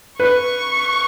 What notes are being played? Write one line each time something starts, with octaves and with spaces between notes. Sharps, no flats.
B4 C#6